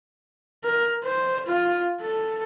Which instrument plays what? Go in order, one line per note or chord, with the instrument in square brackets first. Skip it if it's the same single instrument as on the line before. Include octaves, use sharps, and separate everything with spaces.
[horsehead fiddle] A#4
C5
F4
A4